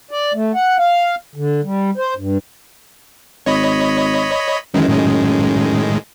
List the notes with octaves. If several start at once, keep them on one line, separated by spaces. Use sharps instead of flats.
D5
A3
F#5
F5
D3
G3
C5
G2
G#1 C#5 D#5 B5
F#2 D#3 E3 G#3
A2 D#3 G#3